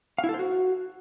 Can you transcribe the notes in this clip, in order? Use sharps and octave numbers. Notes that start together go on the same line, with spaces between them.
F5
E4
A4
C5
F#4